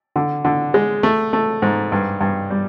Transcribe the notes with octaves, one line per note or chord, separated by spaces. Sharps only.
D3
D3
G#3
A3
A3
G#2
G2
G2
G3